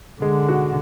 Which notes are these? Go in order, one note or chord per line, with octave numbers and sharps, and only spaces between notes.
D3 G#3
F#4